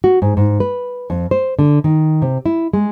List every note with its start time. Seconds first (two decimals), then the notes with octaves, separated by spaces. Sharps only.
0.04 F#4
0.22 G#2
0.37 G#2
0.60 B4
1.10 F2
1.31 C5
1.59 D3
1.84 D#3
2.22 C3
2.46 E4
2.73 G#3